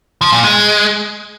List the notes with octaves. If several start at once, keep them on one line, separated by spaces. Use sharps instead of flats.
F3
A#2
G#3